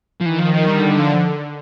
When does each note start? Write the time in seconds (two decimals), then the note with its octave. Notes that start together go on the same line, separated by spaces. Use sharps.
0.21 F3
0.26 D#3 E3
0.39 F3
0.53 F3
0.67 D3 G3
0.99 F3